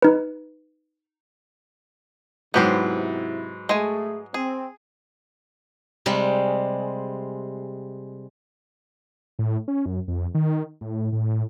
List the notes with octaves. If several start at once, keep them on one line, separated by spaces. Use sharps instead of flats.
D#4 B4
G#2 C3 F#3 B3 E4 G4 B4 C5
G#3 A3 G#4 G#5
C4 G#4
C3 G3 G#3
A2
C#4
F#2
F2
D#3
A2
A2